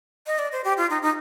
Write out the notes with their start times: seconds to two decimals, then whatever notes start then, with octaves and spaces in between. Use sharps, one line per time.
0.27 D#5
0.39 D5
0.52 C5
0.64 G4
0.77 F4
0.90 D#4
1.02 D#4